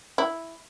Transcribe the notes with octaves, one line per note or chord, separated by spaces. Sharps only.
E4